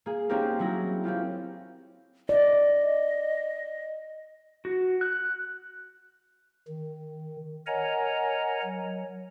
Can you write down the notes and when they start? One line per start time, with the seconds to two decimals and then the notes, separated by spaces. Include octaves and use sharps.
0.06 A#3 G#4
0.29 A#3 C4 C#4 D#4 G4 A#4
0.59 F#3 C#4 E4 G#4 A#6
1.04 C4 C#4 F4 G4
2.29 D5 D#5
4.65 F#4
5.01 F#6
6.68 D#3
7.67 A#4 C#5 D#5 F#5 G#5 A#5
8.63 F#3